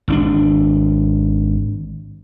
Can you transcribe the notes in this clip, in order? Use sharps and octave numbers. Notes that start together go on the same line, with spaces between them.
G#1 C#4 D4